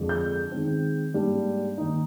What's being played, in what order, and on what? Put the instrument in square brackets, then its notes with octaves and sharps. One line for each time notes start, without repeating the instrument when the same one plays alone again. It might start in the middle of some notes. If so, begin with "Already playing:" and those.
Already playing: [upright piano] F2 D3 G#3 D4
G6
D#3 G#3 C4
G#2 G3 A#3 D4
D#3 A#3 D#4